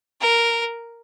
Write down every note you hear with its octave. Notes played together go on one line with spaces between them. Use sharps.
A#4